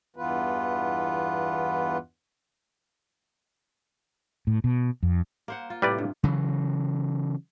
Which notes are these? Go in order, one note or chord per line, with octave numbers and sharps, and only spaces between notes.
E2 G2 E3 B3 F4 B4
A2
B2
F2
A#3 C5 F#5
F4
A2 C3 G3 B4 D5
G2
C#3 E3 F#3